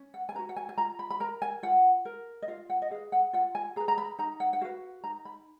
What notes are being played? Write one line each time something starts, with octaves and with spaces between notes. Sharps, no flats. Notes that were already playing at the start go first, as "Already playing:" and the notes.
Already playing: C#4
F#5
G#5
F#4 B4 A#5
F#5
G#5
G#5
F4 A#5
B5
B5
A#4 A#5
G#5
F4 F#5
A#4
D#5
F4 F5
F#5
D#5
G#4 B4 F5
F#5
F4 F#5
G#5
G#4 B4 A#5
A#5
B5
D#4 A#5
F#5
F#5
F#4 B4 F5
D#4 A#5
B5